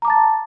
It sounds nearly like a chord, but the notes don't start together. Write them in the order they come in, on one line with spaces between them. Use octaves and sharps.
A#5 D6 A5 A6